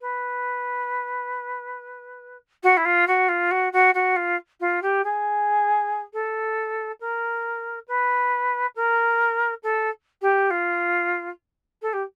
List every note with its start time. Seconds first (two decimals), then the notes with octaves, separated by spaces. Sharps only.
0.01 B4
2.63 F#4
2.77 E4
2.85 F4
3.07 F#4
3.28 F4
3.51 F#4
3.73 F#4
3.94 F#4
4.16 F4
4.60 F4
4.82 G4
5.04 G#4
6.13 A4
7.00 A#4
7.88 B4
8.75 A#4
9.63 A4
10.21 G4
10.50 F4
11.82 A4
11.93 G4